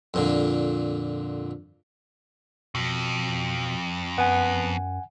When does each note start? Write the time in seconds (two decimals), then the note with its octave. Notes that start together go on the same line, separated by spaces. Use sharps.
0.14 F2 A#2 D3
2.75 F2 B2
4.18 F#2 B3 F#5 G#5